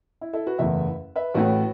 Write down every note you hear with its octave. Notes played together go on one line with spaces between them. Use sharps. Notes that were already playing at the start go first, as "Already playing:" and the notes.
E4
E4 A4
F#4 B4
F#1 E2 E3 A3 B4 E5
B4 E5
A1 A2 A3 F#4 B4